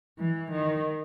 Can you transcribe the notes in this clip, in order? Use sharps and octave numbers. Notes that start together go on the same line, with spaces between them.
E3
D#3